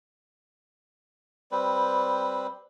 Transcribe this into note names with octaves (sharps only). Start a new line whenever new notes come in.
G3 C4 B4